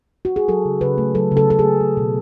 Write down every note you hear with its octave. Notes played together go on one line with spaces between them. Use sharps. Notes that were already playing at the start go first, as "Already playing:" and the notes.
F#4
G#4
F#3 A4
C#3
C#3 B4
A3
F#3 A4
C#3
A4
C#3 A4
A3 G#4
A3
B2